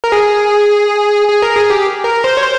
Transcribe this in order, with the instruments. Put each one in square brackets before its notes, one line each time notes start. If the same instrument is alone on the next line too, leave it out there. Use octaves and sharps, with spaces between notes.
[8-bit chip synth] A#4
G#4
G#4
A#4
G#4
G4
A#4
C5
C#5
C5